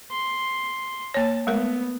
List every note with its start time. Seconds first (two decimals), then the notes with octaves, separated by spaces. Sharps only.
0.12 C6
1.14 A#3 C#5 A5
1.47 G#3 A3 B3 A#4